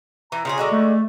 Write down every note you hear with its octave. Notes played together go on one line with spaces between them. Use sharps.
E3 A#5
C#3 F4 G#4
D3 G#3 F#4
A3